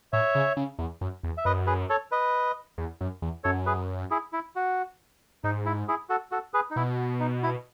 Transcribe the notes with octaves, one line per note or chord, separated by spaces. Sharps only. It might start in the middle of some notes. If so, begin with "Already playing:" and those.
A2 C#5 E5
C#3
C#3
E2
F#2
E2
E5
F#2 B4 D#5
G#4 B4
A4 C#5
B4 D#5
E2
F#2
E2
F#2 A4 C#5
G#4 B4
E4 G#4
E4
F#4
G#2 D#4
E4
E4 G#4
F#4 A4
F#4 A4
G#4 B4
D#4
B2 E4
D#4
E4